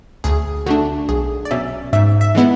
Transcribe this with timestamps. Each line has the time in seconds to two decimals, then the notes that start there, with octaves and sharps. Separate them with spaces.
0.24 D2 G#4
0.66 D3 A3 D4 F#4
1.09 B1 G#4
1.45 D5
1.51 B2 F#3 C#4 E5
1.93 G#2 E5
2.21 E5
2.35 E3 G#3 B3 E4